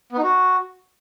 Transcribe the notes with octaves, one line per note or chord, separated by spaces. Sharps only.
B3
D#4
F#4